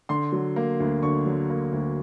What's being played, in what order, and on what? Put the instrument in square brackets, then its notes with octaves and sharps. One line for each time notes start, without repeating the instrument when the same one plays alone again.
[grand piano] D3 C6
F#3
A#3
D2
D3 C#6
F#3
A#3
D2